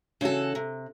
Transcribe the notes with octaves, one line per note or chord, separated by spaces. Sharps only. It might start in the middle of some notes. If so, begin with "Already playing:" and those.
C#3 E3 F#4 A4
C3